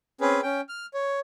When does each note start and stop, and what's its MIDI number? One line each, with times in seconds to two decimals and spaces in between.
0.21 0.41 60
0.21 0.41 61
0.21 0.41 68
0.21 0.41 71
0.43 0.61 61
0.43 0.61 79
0.69 0.86 89
0.94 1.20 73